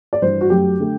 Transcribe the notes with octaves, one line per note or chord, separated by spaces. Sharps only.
D5
G2 E3 G3 C5
F#4
F#2 F#3 A3 G4
D3 A3